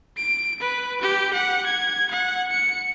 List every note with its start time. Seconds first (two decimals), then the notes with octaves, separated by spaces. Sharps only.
0.17 D7
0.60 B4
1.01 G4
1.33 F#5
1.66 G#6
2.11 F#5
2.51 C#7